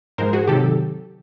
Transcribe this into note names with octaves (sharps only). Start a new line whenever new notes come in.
G#2 F3 G#3 A#4 C5
F#4 G#4
C3 D#3 F#3 G4 A4